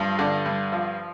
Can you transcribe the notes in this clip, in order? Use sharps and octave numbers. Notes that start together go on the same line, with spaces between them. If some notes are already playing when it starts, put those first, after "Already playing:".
Already playing: G2 F3
D3 D5
G2
F3